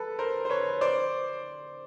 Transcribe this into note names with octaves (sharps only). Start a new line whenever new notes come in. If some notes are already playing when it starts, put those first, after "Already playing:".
Already playing: A4 B4
A#4 C5
C5
B4 C#5
C5 D5